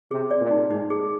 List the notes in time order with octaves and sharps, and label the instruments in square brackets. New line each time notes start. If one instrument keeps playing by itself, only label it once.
[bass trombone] C3 [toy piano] G#4
[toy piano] D5
[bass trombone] A#2
[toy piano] D#4
[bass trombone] G#2 [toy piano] D#4
[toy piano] G#4